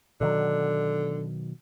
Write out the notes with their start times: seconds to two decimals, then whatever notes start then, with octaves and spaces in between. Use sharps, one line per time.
0.21 B2 D3 D#3 F#3